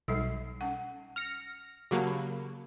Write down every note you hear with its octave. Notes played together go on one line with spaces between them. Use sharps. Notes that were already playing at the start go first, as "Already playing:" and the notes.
B1 G3 D#4 A4 C7
C#4 F#5
F6 A#6 C#7
C#3 F#3 A#3 F#4 G4 A5
A5 B5